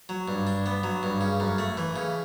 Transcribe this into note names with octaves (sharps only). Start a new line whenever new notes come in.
F#3
G2
D4
B3
F#3
G2
C#3
F#2
A3
E3
C#3